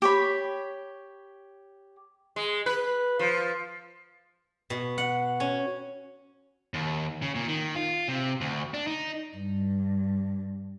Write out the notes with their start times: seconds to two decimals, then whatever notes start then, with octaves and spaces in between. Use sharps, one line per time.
0.02 G4 C#5 B5
2.36 G#3
2.66 B4
3.19 F3
4.70 B2
4.98 F#5
5.40 C#4
6.74 D#2
7.22 C#3
7.35 A#2
7.48 D#3
7.75 F4
8.08 C3
8.41 D2
8.74 D4
8.87 D#4
9.37 G2